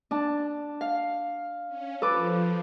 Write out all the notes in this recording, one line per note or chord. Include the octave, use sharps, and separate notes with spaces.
D4 A5
F5
C#4
F3 A4 B4 D6